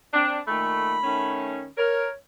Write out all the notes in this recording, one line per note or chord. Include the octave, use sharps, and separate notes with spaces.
C4 D4
A#2 D#3 A3 B5
D#3 A3 C#4
A#4 C#5